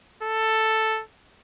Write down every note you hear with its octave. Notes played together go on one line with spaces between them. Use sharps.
A4